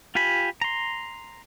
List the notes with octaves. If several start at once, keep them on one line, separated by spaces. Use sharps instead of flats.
F4 G4 G#5 B5
A#5 C6